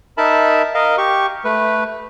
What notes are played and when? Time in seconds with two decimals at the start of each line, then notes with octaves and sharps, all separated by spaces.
0.18 D#4 A#4 E5 A5 B5
0.74 A#4 D#5 F5
0.98 G4 C#6
1.45 A3 B4